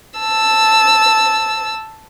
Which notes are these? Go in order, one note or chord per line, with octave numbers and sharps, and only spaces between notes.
A5 E6